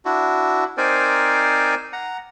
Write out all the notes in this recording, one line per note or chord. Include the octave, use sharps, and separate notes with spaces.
D4 E4 F#4
C4 D#4 A#4 C5 D5 G#5
F#5 A#5